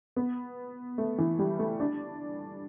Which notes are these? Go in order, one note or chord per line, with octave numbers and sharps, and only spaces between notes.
B3
A3
E3
G3
A3
D4